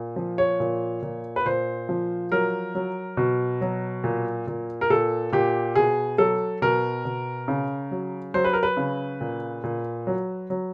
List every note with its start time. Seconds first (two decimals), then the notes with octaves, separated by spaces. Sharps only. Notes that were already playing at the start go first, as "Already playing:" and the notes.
Already playing: A#2
0.16 F3
0.38 C#5
0.60 A#2
1.02 A#2
1.36 B4
1.45 A#2 C5
1.89 F3
2.32 F#3 A#4
2.75 F#3
3.17 B2
3.61 F#3
4.04 A#2
4.47 A#2
4.81 A#4
4.90 A#2 A4
5.32 A#2 G4
5.75 B2 G#4
6.18 F#3 A4
6.62 B2 A#4
7.05 B2
7.48 C#3
7.91 F#3
8.34 F#3 C5
8.45 B4
8.53 A#4
8.63 B4
8.77 C#3
9.21 A#2
9.64 A#2
10.07 F#3
10.50 F#3